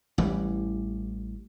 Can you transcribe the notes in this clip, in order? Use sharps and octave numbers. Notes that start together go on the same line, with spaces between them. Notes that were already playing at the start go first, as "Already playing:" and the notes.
A1 E3 G3